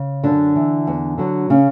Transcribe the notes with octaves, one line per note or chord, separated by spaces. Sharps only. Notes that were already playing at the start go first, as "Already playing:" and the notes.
Already playing: C#3
F#2 D3 D4
E3
E2
D3 F#3
C#3 C#4